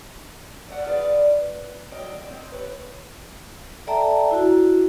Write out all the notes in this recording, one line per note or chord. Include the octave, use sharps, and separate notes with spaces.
A3 D5 D#5 F#5
F4 G#4 B4 D5 F5
B4
D2 F#3 C4 D#5 F5 G5
G#3 C4
G4 B4 C#5
A4 D5 E5 G5 A5 A#5
E4 F#4